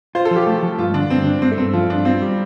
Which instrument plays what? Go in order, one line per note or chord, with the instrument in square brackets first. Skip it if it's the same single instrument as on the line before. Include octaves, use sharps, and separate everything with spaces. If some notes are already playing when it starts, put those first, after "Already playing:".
[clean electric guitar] F4 [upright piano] C5
[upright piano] A4
[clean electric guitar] F3
[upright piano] G4
[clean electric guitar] A3
F3
[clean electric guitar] G2 [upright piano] F4
[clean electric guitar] D3 [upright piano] D4
[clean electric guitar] G2 [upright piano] C4
[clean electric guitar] D4
[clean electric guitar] G2 [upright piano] C4
[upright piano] A3
[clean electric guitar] G2 [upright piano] C4
[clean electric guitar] F3 [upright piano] F4
[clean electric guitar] G2 [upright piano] D4
[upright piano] C4 [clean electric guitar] F4
[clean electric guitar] G3